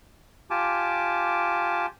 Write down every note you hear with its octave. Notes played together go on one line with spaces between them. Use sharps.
F4 G4 G#5 A5 D6